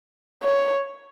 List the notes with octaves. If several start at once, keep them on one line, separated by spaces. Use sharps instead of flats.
C#5